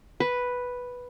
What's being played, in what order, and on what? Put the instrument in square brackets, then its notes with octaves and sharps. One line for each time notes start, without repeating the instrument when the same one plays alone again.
[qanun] B4